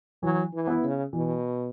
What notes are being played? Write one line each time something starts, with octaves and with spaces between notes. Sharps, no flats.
E3 F#3
E3
B3 E4
C#3
B2 E3